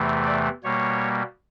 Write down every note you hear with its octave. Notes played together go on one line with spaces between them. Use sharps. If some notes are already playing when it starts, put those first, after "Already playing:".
Already playing: E2 C3 E3 A3
D5
B2 G3 A#3 C#5